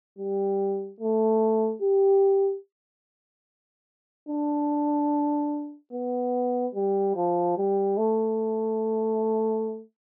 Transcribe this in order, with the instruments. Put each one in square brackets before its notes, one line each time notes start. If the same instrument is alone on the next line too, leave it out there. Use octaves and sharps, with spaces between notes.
[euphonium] G3
A3
G4
D4
B3
G3
F3
G3
A3